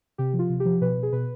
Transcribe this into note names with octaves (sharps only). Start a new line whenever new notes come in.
C3 G4
F3
F4
C3
G4
F3
B2 B4
B2
G#4
B2 B4